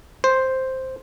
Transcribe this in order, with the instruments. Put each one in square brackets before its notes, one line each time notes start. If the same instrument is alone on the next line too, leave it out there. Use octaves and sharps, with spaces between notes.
[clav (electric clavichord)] C5